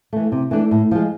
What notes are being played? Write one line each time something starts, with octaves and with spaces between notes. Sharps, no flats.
E3 A3
C3
E3 A3 D4
A2
F3 G#3